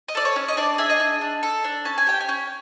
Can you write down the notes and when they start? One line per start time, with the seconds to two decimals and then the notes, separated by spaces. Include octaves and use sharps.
0.08 D#5
0.15 A4 D5
0.25 C#5
0.36 C#4
0.48 D#5
0.57 D4 D5
0.78 G#4 E5
0.89 D#5
1.00 D4
1.21 D4
1.43 A4
1.64 D4
1.85 C#4 A5
1.98 G#5
2.07 G4 G5
2.21 G#5
2.29 C#4